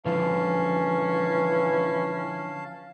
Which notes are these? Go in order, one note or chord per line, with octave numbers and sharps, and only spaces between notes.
D3 E3 F3 C#4 F5 A5